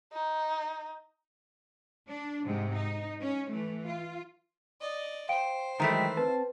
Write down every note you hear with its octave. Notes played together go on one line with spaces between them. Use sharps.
D#4
D4
G#2 C3 G#3
D#4
C#4
E3 A3
F4
D5 D#5
C5 F5 G5 D7
D#3 E3 F#3 G#3 A3 G5 A#5 B6
C4 B4 A5